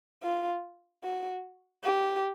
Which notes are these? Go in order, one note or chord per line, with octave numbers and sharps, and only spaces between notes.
F4
F#4
G4